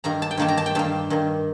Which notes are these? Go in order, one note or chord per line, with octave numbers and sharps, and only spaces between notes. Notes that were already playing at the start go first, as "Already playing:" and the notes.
G2 D#3 A#3 A#5
A5
G5
G2 D#3 A#3 A5
A#5
A5
G5
G2 D#3 A#3 A5
G2 D#3 A#3